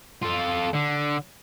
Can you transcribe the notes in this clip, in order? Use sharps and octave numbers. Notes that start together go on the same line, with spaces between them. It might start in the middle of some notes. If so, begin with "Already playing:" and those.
F4 A4
D3